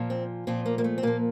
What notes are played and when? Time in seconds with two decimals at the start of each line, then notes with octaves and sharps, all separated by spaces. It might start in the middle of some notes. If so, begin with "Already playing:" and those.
Already playing: A#2 F3
0.10 C4
0.47 A#2 F3 C4
0.66 A#3
0.78 A#3
0.84 A3
0.98 C4
1.03 A#2 F3 A#3